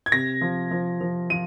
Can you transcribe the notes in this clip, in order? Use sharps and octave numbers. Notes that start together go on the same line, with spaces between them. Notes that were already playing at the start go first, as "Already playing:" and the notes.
G#6
C3 A#6
F3
F3
F3
F3 D#7